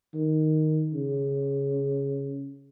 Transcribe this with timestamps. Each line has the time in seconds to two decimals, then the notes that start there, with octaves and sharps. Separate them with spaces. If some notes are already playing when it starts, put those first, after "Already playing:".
0.14 D#3
0.93 C#3